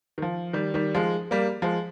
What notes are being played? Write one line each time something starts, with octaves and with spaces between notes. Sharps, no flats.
D#3
F3
D#3 G3
D#3 G3
F3 G#3
G3 A#3
F3 G#3